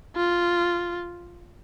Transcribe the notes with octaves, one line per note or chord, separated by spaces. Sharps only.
F4